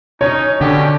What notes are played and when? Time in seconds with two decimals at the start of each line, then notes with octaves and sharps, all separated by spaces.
0.21 C#4 D#4 C#5
0.61 B2 D3 C#4 G4